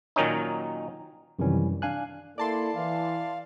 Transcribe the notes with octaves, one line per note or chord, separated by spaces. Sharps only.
A#2 D#3 F#3 C#4 D#4
F#2 C3 D#3 E3 G3 C#4
D4 F5 G#5 F#6
A#3 E4 A4 D5 A5 C6
E3 F5